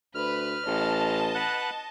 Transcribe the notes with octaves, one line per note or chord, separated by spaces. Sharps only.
D2 B4 F6
A1 D#5 A5
B4 F#5 F#6